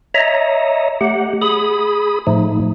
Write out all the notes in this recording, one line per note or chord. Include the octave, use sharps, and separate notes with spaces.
C#5 D#5 E5 A#5
A3 G4 F#5
G#4 B5 D#6
A2 F3 A3 D#4